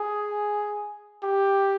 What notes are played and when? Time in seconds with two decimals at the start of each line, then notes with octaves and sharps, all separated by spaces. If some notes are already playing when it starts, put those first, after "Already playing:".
Already playing: G#4
1.23 G4